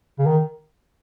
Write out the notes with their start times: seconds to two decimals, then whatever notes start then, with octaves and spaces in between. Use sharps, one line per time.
0.19 C#3
0.26 D#3